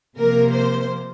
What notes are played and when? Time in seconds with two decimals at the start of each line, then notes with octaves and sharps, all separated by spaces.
0.19 C3 F3 A#3 A#4
0.53 C5